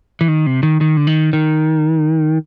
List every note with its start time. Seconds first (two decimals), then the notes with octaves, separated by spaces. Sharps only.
0.21 E3
0.28 D#3
0.46 C3
0.63 D#3
0.81 D#3
0.97 D3
1.07 D#3
1.33 D#3